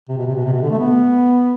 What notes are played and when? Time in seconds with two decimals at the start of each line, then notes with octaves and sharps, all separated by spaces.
0.09 C3
0.18 B2
0.27 C3
0.35 B2
0.45 C3
0.53 B2
0.62 D3
0.70 A3
0.79 B3